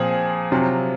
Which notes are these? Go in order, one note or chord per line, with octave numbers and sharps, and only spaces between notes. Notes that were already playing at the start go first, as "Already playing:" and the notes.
Already playing: A#2 F3 C4 G#4
C3 F#3 C4 F4